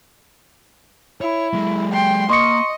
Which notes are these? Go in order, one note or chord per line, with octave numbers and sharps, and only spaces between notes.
E4 C#5
F#3 G#3
G5 C6
A#3 D#5 C6 C#6 C#7